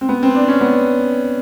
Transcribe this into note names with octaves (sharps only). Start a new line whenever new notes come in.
C4
B3
C4
D4
C#4
B3